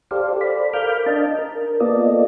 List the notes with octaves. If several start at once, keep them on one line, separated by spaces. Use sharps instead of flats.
G4 A4 C5 D5 F5
A4 C5 D5 B5
A#4 F5 B5 D6 F6 G6
D4 D#5 A5
A#4
A#3 B3 F4 A4 D5 D#5